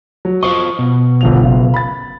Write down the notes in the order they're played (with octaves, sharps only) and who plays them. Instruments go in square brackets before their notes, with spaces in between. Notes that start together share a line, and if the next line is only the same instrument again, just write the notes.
[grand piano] F#3
[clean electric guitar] F4 C5 D#5 [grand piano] C#6
[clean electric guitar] B2
[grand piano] G1 F3 F7
F#1 F4
B5 A6